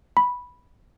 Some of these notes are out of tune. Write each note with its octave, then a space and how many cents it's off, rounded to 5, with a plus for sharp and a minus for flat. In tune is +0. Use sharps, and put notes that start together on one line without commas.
B5 -5